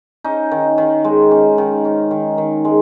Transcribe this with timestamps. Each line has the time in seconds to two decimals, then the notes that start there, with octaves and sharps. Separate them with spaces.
0.24 C#4 D#4
0.51 D#3
0.78 D#3
1.04 G#3
1.31 C#4
1.58 D#3
1.85 C#4
2.11 D#3
2.38 D#3
2.65 G#3